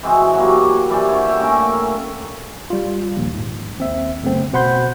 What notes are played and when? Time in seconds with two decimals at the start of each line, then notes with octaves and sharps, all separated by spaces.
0.03 E3 G#3 C4 F#4
0.33 F#3 G3 A#3
0.89 E3 G3 C5 D5
1.09 D3 C#5
1.21 E5 G5
1.40 A3 A#3 C#4 A#4
2.70 G3 F4
3.17 A#1 D#2
3.34 G#2
3.78 D#2 C4 E5
4.23 F#2 C#3 A3 B3 C4
4.53 B2 C5 F#5 B5 C6 G6